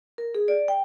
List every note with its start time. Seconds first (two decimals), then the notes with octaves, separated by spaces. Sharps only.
0.18 A#4
0.35 G#4
0.48 D5
0.68 G5